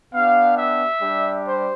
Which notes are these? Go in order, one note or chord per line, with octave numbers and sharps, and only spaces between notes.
B3 D4 G4 F5
E5
G3 D4 G4
C5